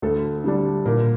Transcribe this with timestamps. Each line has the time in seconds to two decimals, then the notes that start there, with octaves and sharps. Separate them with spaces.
0.02 D2 A4
0.44 D3 G3 D4
0.85 A#2 A#4